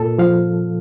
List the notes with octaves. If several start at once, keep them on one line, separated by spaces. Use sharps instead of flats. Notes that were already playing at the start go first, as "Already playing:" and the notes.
Already playing: A#2 A4
F3 F5